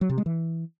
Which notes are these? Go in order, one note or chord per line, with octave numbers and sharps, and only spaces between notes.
F#3
C3
G#3
E3